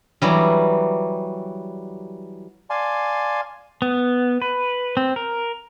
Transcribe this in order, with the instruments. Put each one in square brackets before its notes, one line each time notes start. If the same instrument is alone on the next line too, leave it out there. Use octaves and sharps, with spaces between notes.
[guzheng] E3 F#3 G3
[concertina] D5 F5 G#5 A5 C6
[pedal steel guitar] B3
B4
C4
A#4